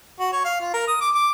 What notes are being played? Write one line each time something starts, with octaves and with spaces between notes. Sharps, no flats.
F#4
C#5
F5
F4
A#4
D#6
D6
D6